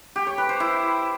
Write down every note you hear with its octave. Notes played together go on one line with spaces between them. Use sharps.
G4
C#5
B4
C5
E4